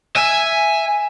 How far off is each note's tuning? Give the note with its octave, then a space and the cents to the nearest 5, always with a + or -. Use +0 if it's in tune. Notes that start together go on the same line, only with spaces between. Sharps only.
E5 +5 G#5 +0